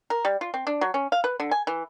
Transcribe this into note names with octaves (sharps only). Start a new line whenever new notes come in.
A#4
G3
F4
C4
D4
F#3
C#4
F5
B4
D3
G#5
E3